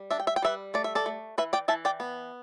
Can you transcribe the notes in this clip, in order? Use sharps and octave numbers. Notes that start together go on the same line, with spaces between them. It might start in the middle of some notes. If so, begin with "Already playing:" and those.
Already playing: G3
D4 E5
G5
E5
G5
G3 B4 E5
A3 D5
E5
A4 D5
A3
E3 B4 E5
D5 G5
E3 E5 A5
D5 G5
B3